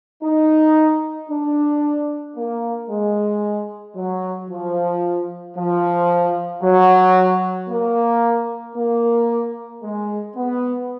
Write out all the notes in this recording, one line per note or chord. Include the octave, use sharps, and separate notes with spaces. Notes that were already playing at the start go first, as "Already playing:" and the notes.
D#4
D4
A#3
G#3
F#3
F3
F3
F#3
A#3
A#3
G#3
B3